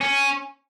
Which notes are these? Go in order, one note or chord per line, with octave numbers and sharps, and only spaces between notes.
C#4